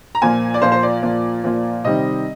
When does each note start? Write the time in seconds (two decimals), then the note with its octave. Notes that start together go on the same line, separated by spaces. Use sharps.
0.15 A#5
0.22 A#2 F3 A#3 F4 G#5
0.54 D5
0.62 A#2 F3 A#3 F4 C5
0.72 C5
0.83 D5
1.02 A#2 F3 A#3 F4
1.44 A#2 F3 A#3 F4
1.84 C3 D#3 G3 C4 D#5